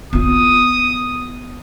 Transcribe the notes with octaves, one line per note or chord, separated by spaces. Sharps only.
B3 F4 D#6